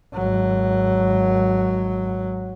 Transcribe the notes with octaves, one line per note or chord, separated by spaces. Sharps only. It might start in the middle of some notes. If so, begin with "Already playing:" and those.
G#1 F#3